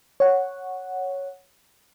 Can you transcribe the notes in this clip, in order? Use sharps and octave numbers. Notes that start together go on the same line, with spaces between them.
C#5 F#5